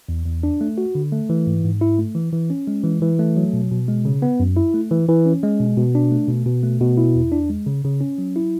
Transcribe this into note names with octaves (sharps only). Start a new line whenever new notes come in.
E2
E2
D4
A3
F#4
D3
A3
E3
G#2
G#2
E4
A3
E3
E3
C#4
G#3
E3
E3
A3
F#3
B2
B2
G#3
C#3
B3
F#2
E4
A3
E3
E3
C#4
G#3
B2
B2
D4
A3
B2
B2
A3
B2
E4
E2
D4
G#3
C#3
C#3
C#4
F#3
E4